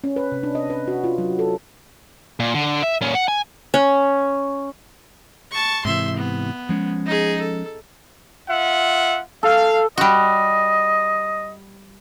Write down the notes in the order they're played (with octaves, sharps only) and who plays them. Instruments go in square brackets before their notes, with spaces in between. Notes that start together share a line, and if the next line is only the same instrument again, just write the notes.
[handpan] C#4
B4
C3
D4
D#5
B4
F#4
F4
F#3
A4
[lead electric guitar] A#2
D3
E5
A#2 C#4
F#5
G#5
[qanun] C#4
[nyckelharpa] A5 C#6
[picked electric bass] G#2 C3 E3 [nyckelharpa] E5 C6
[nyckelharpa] B3
[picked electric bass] F3 G#3 C#4
[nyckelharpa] D#4 G#4
A4
[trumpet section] F4 E5 F#5
[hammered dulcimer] A4 [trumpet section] F5
[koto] G3 F#4 [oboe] D#5